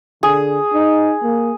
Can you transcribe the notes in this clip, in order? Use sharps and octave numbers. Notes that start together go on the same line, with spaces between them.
D3 G#4
D#4
A#3